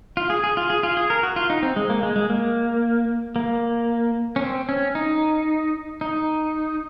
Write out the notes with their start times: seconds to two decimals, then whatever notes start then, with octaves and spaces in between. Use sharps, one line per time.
0.17 F4
0.30 G#4
0.44 G#4
0.57 F4
0.70 G#4
0.83 F4
0.97 G#4
1.10 A#4
1.23 F#4
1.36 F4
1.50 D#4
1.63 C4
1.76 G#3
1.89 A#3
2.03 G#3
2.16 G#3
2.29 A#3
3.36 A#3
4.36 C#4
4.42 C4
4.69 C#4
4.95 D#4
6.01 D#4